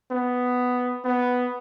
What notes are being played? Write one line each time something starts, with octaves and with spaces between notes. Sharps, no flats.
B3
B3